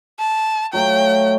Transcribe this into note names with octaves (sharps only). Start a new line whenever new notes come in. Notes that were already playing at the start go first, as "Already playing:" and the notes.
A5
F#3 A3 F5 G5